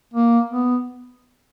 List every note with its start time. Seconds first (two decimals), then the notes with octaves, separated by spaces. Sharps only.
0.14 A#3
0.51 B3